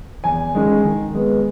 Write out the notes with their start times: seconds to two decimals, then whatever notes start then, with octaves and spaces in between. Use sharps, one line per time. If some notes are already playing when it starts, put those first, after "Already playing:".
0.24 E2 G#5
0.55 D#3 G#3 C#4
0.85 D#3
1.14 G#3 B3